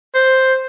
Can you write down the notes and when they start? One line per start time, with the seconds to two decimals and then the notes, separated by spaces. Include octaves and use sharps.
0.15 C5